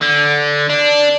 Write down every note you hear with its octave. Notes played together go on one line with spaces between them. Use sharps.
D3
D4